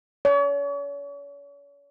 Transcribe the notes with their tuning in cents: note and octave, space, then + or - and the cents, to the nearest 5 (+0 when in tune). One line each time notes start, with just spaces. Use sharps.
C#5 +40